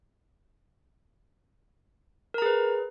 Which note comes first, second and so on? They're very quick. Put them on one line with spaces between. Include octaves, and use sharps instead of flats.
A#4 A#5 G#4 B4